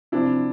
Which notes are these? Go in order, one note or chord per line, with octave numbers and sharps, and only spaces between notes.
C3 F3 D4 E4